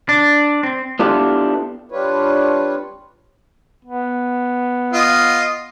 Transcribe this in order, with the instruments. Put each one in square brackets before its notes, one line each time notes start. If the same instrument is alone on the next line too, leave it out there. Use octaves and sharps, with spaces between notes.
[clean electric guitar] D4
C4
[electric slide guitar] B3 D4 E4 F4 G4 A4
[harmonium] G3 D4 F4 B4 C#5
[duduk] B3
[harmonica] F4 D#5